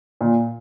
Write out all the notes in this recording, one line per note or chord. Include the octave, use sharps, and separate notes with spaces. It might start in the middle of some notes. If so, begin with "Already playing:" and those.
A#2